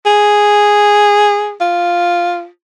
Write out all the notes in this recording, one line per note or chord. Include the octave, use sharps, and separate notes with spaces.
G#4
F4